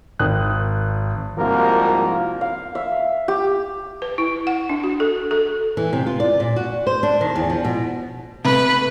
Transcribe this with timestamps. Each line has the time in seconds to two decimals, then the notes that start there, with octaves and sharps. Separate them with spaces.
0.19 G#1 D#3 D#6 F#6
1.37 C2 G#2 F3 A#3 F#4 A#4
2.41 F5
2.75 E5
3.28 G4
4.02 B4
4.18 E4
4.47 F#5
4.69 D4
4.83 F#4
5.00 A4
5.31 A4
5.77 E3
5.93 C3
6.06 F4
6.20 D5
6.40 A#2
6.56 F#4
6.87 C5
7.03 D4
7.21 D#3
7.35 E2
7.50 F3
7.65 B2
8.45 C3 A3 B4